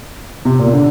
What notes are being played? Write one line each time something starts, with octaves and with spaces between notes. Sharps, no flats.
C3
A#2
C3
D3